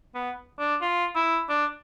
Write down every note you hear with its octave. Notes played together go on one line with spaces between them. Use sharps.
B3
D4
F4
E4
D4